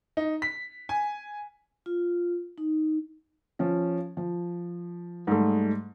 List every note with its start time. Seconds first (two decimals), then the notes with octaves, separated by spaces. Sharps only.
0.17 D#4
0.42 B6
0.89 G#5
1.86 F4
2.58 D#4
3.59 F3 C#4
4.17 F3
5.27 G#2 G3 A3